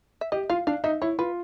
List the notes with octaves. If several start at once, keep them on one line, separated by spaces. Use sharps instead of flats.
E5
G4 D#5
F4 F5
D4 F5
D#4 E5
E4 C#5
F4 B4